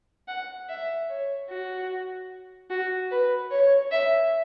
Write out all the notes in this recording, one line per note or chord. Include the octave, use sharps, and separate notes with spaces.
F#5
E5
C#5
F#4
F#4
B4
C#5
E5